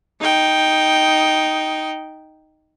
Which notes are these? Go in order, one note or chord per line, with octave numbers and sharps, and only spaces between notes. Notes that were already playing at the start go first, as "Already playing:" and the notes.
D#4 G5